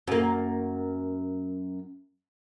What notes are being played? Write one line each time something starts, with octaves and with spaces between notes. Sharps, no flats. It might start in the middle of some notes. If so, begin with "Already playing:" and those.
F#2 A#3